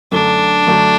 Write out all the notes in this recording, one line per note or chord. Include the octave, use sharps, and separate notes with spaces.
F#2 D3 F#3 A3 D4
F#2 D3 F#3 A3